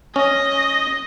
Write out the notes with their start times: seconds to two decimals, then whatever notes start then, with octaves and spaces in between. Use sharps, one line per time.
0.16 C#4 D#5